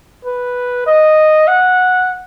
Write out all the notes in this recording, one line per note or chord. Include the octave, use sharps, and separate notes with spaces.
B4
D#5
F#5